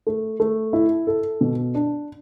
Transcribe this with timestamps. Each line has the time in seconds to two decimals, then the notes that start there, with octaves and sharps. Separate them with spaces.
0.07 A3
0.40 A3
0.73 E4
1.07 A4
1.41 B2
1.75 D4